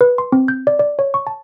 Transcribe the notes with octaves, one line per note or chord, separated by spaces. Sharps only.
B4
C6
C4
G6
D5
D5
C#5
C#6
A5